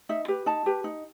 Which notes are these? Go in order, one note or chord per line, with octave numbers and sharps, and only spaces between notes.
D#4 E5
G4 B4
D#4 A5
G4 B4
D#4